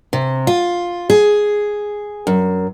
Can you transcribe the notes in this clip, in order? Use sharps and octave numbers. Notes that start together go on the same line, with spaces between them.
C3
F4
G#4
F#2